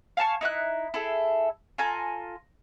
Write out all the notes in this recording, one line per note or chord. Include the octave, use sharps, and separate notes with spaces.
F5 G#5 A5 C#6
D#4 E4 D6 F#6
E4 G#4 A4
F4 A4 G#5 A#5